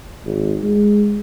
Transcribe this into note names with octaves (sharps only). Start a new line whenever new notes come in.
G#1
G#3